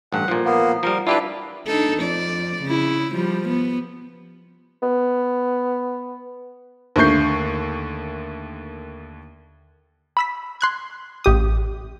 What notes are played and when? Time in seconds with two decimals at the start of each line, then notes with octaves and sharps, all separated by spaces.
0.12 A1 G2 F#5
0.28 A#2 F3
0.45 A#3 B3
0.83 F3 G3 A#4
1.07 D4 E4 F4 G4 B4
1.66 D4 D#4 A4
1.98 F2 D5
2.63 C#3 E4
3.13 F3 G3
3.48 B3
4.82 B3
6.96 D#2 D3 A3 C#6 G6 C7
10.17 B5 E6 B6
10.61 C6 F#6 G#6
11.24 A1 G4 D#6